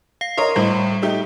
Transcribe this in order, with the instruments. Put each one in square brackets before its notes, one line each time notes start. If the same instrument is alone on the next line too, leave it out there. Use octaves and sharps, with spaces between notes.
[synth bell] F5 C7
[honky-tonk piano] A#4 C#5 D#5 [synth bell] C6
[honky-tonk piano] A2 [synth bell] G3
[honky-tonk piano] A3 D#4 G4